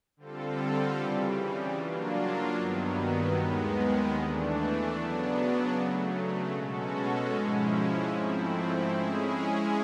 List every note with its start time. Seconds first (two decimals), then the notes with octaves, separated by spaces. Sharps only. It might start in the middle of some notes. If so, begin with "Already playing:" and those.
0.17 D3 G3 C4 F4 A4
0.96 C#3 E3 G3
1.75 F#3 A#3 D4 F4
2.55 G2 D#3 F#3 B3
3.34 D#2 D#3 G#3 B3
4.13 E3 A3 D4
4.93 C#3 F#3 B3 D4
5.72 C#3 F#3 A3
6.52 B2 G#3 C#4 F#4 A4
7.31 G#2 F3 G#3 C#4 E4
8.10 G#2 F3 A3 C4 E4
8.90 G#3 C#4 E4 G#4